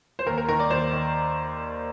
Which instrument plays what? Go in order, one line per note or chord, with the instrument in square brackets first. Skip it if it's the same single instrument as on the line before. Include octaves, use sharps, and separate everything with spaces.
[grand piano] C5
D#2 A#4
A#4
D#3 A#4
D5
D#2 C5
D#3